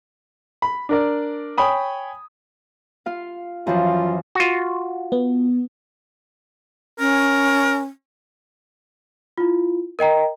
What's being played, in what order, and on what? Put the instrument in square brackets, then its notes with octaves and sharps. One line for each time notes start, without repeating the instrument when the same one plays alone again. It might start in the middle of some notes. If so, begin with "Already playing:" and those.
[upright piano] B5
D4 A#4 D5
C#5 G5 G#5 B5 D#6
[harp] F4 F5
[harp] F#2 E3 F3 [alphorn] F4
[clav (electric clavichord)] F4 F#4
[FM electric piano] B3
[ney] C#4 [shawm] A#4
[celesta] E4 F4
A#4 D#5 G5 A#5